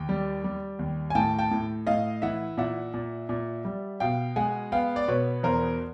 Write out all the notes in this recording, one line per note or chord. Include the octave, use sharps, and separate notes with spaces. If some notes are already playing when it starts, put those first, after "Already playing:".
Already playing: D#2 G5
G3
G3
D#2
G#5
A2 G5 A5
G5 A5
A2
A2 D#5 F5
E3 E5 F#5
A#2 E5 F#5
A#2
A#2
G3
B2 F5 G5
G#3 F#5 G#5
B3 F5 G5
D5
B2 B4 C#5
E2 A#4 C5